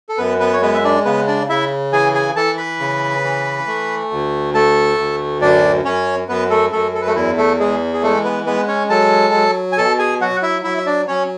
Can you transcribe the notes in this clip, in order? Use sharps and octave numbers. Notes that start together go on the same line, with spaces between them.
A4
F#2 B3 B4
B3 B4
C#5
G#3 B3 B4
E5
D4 D5
C#3 B3 B4
D4 D5
C#3 E4 E5
E3 G#4 G#5
G#4 G#5
E3 A4 A5
B4 B5
C#3
E3
A3
D2
A3 A4 A5
D2
F#2 D4 D5
F#2 C#4 C#5
F#2 B3 B4
A3 A4
F#2 A3 A4
A4
B4
A3 A4
E2 E4
A3 A4
E3 G#3 G#4
G#4
G#3 A3 A4
B3 B4
G#3 B3 B4
C#4 C#5
F#3 A4 A5
F#3
G#5
B2 A4 A5
G#4 G#5
F#3 F#4 F#5
E4 E5
F#3 E4 E5
E5
D4 D5
F#3 C#4 C#5